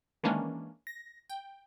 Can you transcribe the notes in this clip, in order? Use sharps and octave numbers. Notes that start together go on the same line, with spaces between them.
D#3 E3 G#3 A#3 C#4 D4
A#6
G5